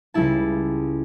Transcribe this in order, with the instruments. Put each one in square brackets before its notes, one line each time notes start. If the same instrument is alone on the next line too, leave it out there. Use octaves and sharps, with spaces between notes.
[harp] C#2 G3 D#4 E4 A5